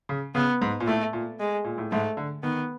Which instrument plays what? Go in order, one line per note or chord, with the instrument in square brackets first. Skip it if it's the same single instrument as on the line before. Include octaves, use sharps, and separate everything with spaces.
[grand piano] C#3
[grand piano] C#3 [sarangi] B3
[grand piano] G#2
A#2
[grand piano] A2 [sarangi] A3
[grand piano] A#2
[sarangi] G#3
[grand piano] A#2
A2
[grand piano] G#2 [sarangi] A3
[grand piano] D3
[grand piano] D#3 [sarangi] B3